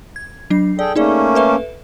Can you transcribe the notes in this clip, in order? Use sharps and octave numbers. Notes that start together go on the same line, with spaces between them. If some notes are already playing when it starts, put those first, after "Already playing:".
G#6
F#3 D4 C7
G#4 A4 D5 G5
A3 A#3 C#4 D#4 G#4 D5
A4 B4 E5